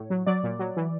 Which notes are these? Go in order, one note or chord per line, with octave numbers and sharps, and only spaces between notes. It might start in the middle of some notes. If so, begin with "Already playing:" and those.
Already playing: A2 C#5
F#3
F#3 D5
A#2
F#3
E3